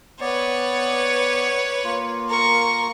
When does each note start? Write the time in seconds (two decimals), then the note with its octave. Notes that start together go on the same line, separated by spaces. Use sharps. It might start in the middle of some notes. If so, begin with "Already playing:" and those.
0.20 B3 B4 C#5 D5
1.84 A#3 F4
2.29 A#4 C#6